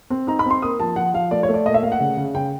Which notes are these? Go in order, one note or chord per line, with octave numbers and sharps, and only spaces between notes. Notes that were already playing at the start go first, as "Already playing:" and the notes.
C4
D#4 A#5
B5
C4 C6
A#3 D#6
F3 A5
F3 F#5
F3 F5
A3 D5
C#5
A3
D5
A#2 D#5
E5
A3 F5
F#5
C#3
C#3
C#3 G5